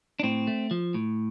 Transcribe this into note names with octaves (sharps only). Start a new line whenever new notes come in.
D4
A2 C4
A3
F3
A2